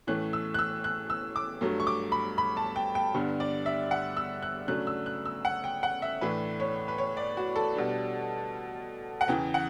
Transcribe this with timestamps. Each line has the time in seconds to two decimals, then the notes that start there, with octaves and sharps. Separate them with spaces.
0.07 A2 E3 A3 C#4 F#6
0.33 E6
0.54 F#6
0.59 E6
0.84 F#6
1.10 E6
1.36 D6
1.61 G2 F#3 A3
1.80 C#6
1.87 D6
2.12 B5
2.38 B5
2.57 A5
2.76 G5
2.95 G5
3.14 G2 D3 G3 B3
3.40 D5
3.66 E5
3.91 F#5
4.17 E6
4.42 F#6
4.68 C#3 F#3 A3 D4 F#6
4.87 E6
5.06 F#6
5.25 E6
5.45 F#5
5.64 G5
5.83 F#5
6.02 E5
6.21 A2 E3 A3 D4 B4
6.60 C#5
6.88 B4
6.98 C#5
7.17 D5
7.37 F#4
7.56 A4
7.75 B2 G3 D4
9.21 F#5
9.28 E2 C#3 E3 G5
9.54 F#5